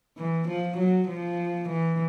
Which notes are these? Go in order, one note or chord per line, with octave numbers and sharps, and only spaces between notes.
E3
F3
F#3
F3
E3